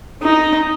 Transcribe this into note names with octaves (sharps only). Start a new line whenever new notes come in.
D#4